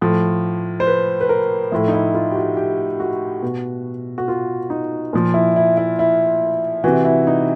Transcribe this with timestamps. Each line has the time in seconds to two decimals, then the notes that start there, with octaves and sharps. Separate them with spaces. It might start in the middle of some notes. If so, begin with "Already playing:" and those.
0.01 A2 F3
0.80 C5
0.87 B4
1.21 B4
1.29 A#4
1.72 A2 F3 E4
1.88 D#4
1.93 E4
2.14 F4
2.31 G4
2.35 F#4
2.57 G4
3.00 F#4
3.42 B2
4.18 F#4
4.28 F4
4.70 D#4
5.13 A#2 F3
5.34 E4
5.56 E4
5.77 E4
5.99 E4
6.84 C3 E3 F#4
7.05 E4
7.27 D#4